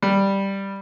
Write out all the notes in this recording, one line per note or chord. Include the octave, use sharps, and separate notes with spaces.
G3